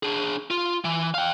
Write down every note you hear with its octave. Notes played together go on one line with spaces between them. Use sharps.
D4 G#4
F4
E3
F5 G5